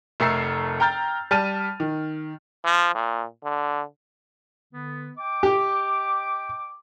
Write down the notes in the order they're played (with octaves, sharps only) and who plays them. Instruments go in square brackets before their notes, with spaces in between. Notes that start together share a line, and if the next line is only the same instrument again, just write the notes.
[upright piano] F1 A3 A4 A#4 E6 C7
G5 A#5 F6 G6 A6
G3 A5 F6 A6 D#7
D#3
[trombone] F3
A#2
D3
[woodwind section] D3 B3
D#5 G5 D6
[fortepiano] G4